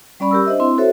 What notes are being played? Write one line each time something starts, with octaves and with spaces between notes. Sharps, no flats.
G3 C#4 D5 B5 C#6
G4 A#4 E6
D4 C5 D#5 E5
C4 E4 C6
F#4 A4 C5 C#5 E5